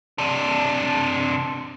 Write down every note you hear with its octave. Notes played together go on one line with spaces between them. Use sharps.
C3 D4